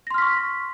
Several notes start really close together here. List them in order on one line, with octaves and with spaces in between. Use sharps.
A#6 C6 F6 B6 C#6